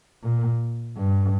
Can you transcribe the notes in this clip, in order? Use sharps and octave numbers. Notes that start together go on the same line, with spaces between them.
A#2
G2